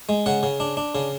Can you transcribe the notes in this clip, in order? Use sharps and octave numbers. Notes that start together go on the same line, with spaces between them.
G#3
C#3 F#5
C#3
D4
D4
C#3